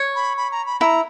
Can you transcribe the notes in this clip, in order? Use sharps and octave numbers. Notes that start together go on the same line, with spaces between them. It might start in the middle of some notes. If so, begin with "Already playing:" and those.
Already playing: C#5
B5
B5
A#5
B5
E4 A#5